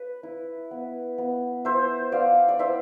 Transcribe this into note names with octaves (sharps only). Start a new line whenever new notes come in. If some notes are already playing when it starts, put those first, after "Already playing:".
Already playing: B4
E4
B3
B3
E4 C5 E5
B3 D5 F5
D5
E4 C5 E5